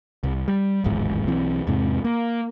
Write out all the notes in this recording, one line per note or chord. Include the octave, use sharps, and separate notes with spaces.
C2
G3
D1 G#1 E2 G#2
B1 E3 C4
E2 G#2 C3
A#3